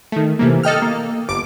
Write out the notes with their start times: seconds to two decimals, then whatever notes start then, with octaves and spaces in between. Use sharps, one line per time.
0.12 D#3 A3
0.39 C3 E3 A#3
0.63 A4 D#5 G5 F6
0.82 A#3
1.29 G1 D6 D7